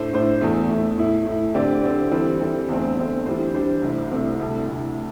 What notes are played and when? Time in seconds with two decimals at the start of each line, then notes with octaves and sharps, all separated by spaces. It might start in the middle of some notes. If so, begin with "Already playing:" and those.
Already playing: A2 A3 D4 C5
0.13 A2 A3 D4 C5
0.41 E2 E3 A3
0.69 E2 E3 A3
0.98 A2 A3 E4
1.26 A2 A3 E4
1.54 D3 C4 G4 D5
1.83 D3 C4 G4 D5
2.11 E3 G3 C4 A4
2.41 E3 G3 C4 A4
2.68 E2 D3 A3 C4
2.97 E2 D3 A3 C4
3.26 E3 G3 D4 C5
3.54 E3 G3 D4 C5
3.82 C2 C3 A3 C4 E4
4.11 C2 C3 A3 C4 E4
4.40 D2 C3 A3 E4
4.68 D2 C3 A3 E4